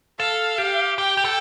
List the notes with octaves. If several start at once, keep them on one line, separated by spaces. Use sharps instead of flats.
A4 F5
G4
G4 G5
G4
A4